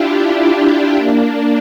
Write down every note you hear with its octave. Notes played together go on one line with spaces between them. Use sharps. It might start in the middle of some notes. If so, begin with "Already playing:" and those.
Already playing: D4 E4 F4 G4
D4 F4
A#3 D4